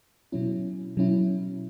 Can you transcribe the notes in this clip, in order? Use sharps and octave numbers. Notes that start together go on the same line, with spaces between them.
B2 F#3 C#4 E4
B2 F#3 C#4 E4